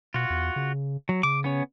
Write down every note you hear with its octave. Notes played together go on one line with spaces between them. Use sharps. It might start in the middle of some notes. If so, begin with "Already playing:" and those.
B2 F4 F#4
E2
C#3
F#3
C#3 D6
B3 C#4 C#5